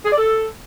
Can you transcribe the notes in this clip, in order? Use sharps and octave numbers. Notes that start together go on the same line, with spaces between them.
G#4
D5
A4